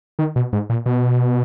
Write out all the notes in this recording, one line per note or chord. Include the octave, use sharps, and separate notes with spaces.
D#3
B2
G#2
A#2
B2